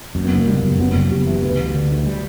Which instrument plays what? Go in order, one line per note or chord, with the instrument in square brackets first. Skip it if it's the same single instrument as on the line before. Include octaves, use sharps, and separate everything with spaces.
[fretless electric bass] F#2 [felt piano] A#3
[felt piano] B3
[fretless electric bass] F#1 [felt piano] A#3
[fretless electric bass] F#1 [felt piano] G3
[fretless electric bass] F#1
[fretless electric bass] F#2 [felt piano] B3
[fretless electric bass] F#1
[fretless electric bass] F#1 [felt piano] G4
[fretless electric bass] E3
[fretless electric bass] D2 [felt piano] B4
[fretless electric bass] D2
D3
D2
G3